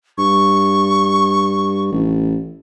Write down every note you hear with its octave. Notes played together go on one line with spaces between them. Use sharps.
G2 C#6
A1